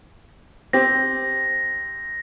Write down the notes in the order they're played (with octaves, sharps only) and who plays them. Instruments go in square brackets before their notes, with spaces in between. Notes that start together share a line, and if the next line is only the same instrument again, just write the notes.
[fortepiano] C4 G4 [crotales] A#6